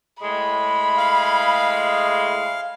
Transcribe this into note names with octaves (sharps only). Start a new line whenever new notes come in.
A2 G#3 B5
F5